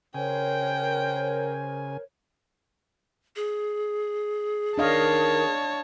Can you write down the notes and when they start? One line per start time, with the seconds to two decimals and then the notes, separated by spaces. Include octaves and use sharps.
0.14 C#3 A#4 C5 C#5 G5 G#5
3.36 G#4
4.78 D#3 D4 C#5 D#5 F5 A5